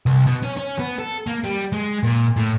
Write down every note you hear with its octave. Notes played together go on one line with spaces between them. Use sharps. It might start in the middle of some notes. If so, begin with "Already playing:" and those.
C2
B2
C#4
C#4
B3
A4
A#3
G3
G#3
A#2
A2